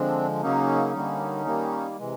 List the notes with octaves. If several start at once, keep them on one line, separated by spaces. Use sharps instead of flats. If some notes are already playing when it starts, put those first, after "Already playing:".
Already playing: D3 F3 G#3 C4 D4
C#3 F#3 A#3 C#4 D#4
D3 G3 A#3
D#3 G3 A#3
C3 E3 G#3